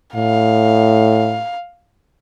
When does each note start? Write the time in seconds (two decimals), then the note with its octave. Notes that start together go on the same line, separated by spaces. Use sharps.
0.15 A2 F5